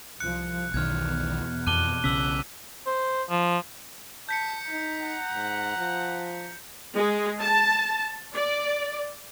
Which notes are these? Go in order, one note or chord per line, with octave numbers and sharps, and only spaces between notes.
C2 F3 F#6 C#7
B1 E2 B2 D#3 F6 G#6
F2 A5 D6 F#6 D#7 G7
B1 C#3 C#4 D6 E6 B6 F#7
C5
F3
A5 G6 B6 C#7
D#4 A#5
F#5
G#2
F3
G#3
A5
D5